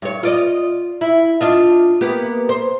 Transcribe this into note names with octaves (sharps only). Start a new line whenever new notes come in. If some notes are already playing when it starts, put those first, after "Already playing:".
G2 C#5
F4 D5 D#5
E4
D4 F4 D#5
A#3 B3 G4
C5